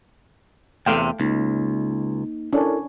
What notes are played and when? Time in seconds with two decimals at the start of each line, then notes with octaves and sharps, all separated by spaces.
0.86 E2 C3 A3 F5 G5
1.20 C#2 A#3 D#4
2.53 C#4 D4 E4 A4 A#4